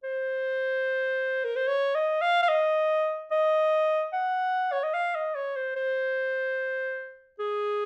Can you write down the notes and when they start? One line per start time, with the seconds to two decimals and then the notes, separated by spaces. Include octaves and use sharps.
0.04 C5
1.45 A#4
1.56 C5
1.68 C#5
1.95 D#5
2.21 F5
2.43 F5
2.49 D#5
3.31 D#5
4.13 F#5
4.72 C#5
4.83 D#5
4.94 F5
5.15 D#5
5.35 C#5
5.56 C5
5.76 C5
7.39 G#4